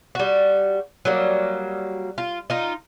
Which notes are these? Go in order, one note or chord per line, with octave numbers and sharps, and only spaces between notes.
G3 F#4
F#3 G3 A#3
F4
D#4 F4